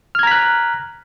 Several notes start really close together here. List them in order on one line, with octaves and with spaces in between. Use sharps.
F6 G#6 A#5 B6 F#6